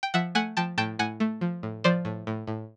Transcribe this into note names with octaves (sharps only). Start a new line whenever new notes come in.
G5
F3 E5 F#5
A3 F#5 G#5
F3 G5 A5
A2 G5 A5
A2 F#5 G#5
A3
F3
A2
F3 C5 D5
A2
A2
A2